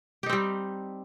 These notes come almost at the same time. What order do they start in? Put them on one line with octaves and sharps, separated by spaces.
G4 D#4 C4 G3